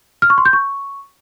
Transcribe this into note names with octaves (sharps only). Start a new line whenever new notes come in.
F6
C#6
C6
G6
C#6